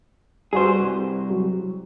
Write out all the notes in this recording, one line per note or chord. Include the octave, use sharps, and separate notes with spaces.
G3 F#4 G#4 B4 C5
C2
F#3